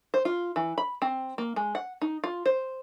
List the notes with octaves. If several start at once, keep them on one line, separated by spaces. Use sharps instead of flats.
C5
F4
E3
B5
C4
A#3
G#3
F#5
D#4
F4
C5